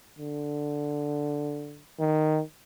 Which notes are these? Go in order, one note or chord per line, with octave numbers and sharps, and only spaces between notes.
D3
D#3